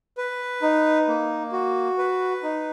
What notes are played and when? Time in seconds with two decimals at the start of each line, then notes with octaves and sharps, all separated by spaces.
0.18 B4
0.62 D#4
1.08 A#3
1.52 F#4
1.98 B4
2.43 D#4